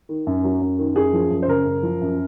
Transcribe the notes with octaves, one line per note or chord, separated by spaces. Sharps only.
D#3
F#2
F#3
F#2
D#3
F#2 G#4
F3
F#2
C5
C#3 A#4
F#2
F3
F#2